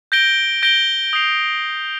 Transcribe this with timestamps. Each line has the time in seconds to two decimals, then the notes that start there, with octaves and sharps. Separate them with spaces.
0.12 G6 A#6 D7 G7
0.63 G6 A#6 D7 G7
1.13 D#6 G6 C7 F7